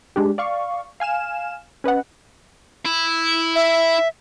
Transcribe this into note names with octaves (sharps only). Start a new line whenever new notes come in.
G#3 D4 G4
D5 F5 C#6
F5 G#5 F6 E7
C#4 B4 D#5 F#5
E4
E5